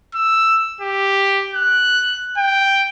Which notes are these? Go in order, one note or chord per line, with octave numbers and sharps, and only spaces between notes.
E6
G4
F#6
G5